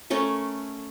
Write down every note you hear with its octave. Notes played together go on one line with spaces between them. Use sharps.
A3 C#4 A4 A#4